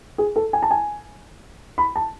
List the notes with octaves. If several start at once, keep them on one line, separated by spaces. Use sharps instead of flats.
G#4
A4
G#5
A5
G#5
B5
A5